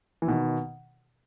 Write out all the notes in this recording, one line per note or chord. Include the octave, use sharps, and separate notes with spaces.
E3
B2 D#3